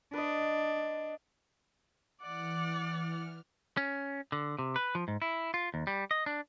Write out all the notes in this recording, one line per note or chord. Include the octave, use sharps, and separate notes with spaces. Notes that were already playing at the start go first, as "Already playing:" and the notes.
D4 B4 D#5
E3 D5 F#5 F6
C#4
D3
C3
B4
F3
G#2
E4
F4
D#2
G3
D#5
D4